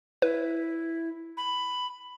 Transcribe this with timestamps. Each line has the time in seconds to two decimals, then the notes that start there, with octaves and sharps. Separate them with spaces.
0.22 E4 B4
1.37 B5